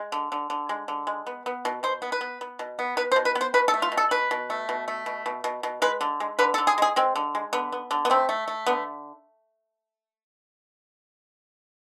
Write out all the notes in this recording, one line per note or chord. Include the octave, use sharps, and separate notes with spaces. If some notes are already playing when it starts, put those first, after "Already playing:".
Already playing: G#3
D3
D3
D3
G#3
D3
G#3
B3
B3
B2
B2 C5
B3
B4
B3
B3
B2
B3
B3 B4
C5
B2
B4
B3
C5
B2 B4
A4
A3
F4
B2
A4
B2 B4
B2
A3
B2
A3
B2
B2
B2
B2
G#3 B4
D3
G#3
D3 B4
A4
D3
G#4
G#3 G#4
G#3 C4
D3
G#3
D3 B3
B3
D3
B3
A3 C4
A3
A3
D3 B3